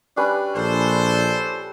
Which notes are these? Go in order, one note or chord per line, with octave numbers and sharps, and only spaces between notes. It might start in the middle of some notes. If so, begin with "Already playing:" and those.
G3 C#4 D4 B4
A#1 A4 C5